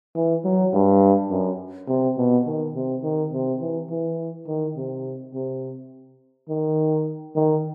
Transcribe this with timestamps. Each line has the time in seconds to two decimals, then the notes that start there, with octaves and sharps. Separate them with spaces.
0.15 E3
0.45 F#3
0.73 G2
1.31 F#2
1.88 C3
2.18 B2
2.46 D#3
2.76 C3
3.03 D#3
3.33 C3
3.61 E3
3.90 E3
4.48 D#3
4.76 C3
5.34 C3
6.50 D#3
7.36 D#3